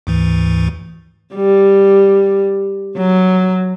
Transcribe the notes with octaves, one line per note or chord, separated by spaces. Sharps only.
D2 G#2 E3
G3
F#3